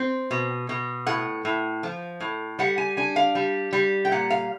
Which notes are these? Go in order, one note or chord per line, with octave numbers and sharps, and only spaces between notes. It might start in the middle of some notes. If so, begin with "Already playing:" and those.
Already playing: C4
B2
B2
A2 F#5
A2
F3
A2
G3 F#5
G#5
D4 G#5
F5
G3
G3
G5
A#2 F#5
F5